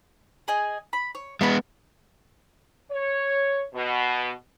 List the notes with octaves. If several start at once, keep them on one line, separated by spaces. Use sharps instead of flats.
G#4 D#5 G#5
B5
C#5
G#3 B3 F5 B5
C#5
B2